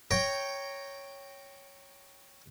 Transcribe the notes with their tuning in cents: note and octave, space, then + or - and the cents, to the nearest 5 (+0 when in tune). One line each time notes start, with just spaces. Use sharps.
C#5 +0 G5 +0 A#5 -5